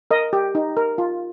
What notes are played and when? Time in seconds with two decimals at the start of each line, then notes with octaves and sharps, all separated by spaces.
0.11 A#4 D#5
0.33 G4
0.55 D#4
0.77 A#4
0.98 F4